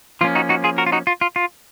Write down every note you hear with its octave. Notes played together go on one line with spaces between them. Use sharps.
F3 A#3 C#4 F4
D#4 F#4
D#4 F#4
F4 G#4
F#4 A#4
F4
D#4 F#4
F4
F4
F4